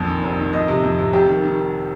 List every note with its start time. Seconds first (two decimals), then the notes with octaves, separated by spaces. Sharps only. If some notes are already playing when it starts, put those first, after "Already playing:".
Already playing: A#1 F2
0.08 D#3
0.23 F1
0.39 D#3
0.53 F2 D#5
0.68 C3
0.83 F2
0.98 C3
1.13 F1 G4
1.28 D#3
1.43 D#3